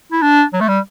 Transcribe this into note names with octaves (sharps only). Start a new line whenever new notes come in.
E4
D4
F#3
A3
G3